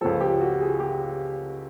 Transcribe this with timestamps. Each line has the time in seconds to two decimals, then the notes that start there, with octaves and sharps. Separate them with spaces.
0.01 C#2 C#3 F3 A4
0.21 G4
0.41 F#4
0.61 G#4
0.80 G4